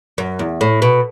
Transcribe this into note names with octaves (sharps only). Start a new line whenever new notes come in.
F#2
E2
A2
B2